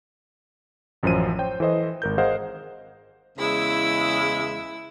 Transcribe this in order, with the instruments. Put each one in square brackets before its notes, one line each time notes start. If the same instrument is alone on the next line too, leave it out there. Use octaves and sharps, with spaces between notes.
[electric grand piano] A1 F#2 F3 C5 D#7
C5 C#5 G5
E3 A4 C5 D#5
G#1 A#4 G6
G#4 A#4 C5 D#5 F5 F#5
[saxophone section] E2 C#3 G#3 [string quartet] E4 E6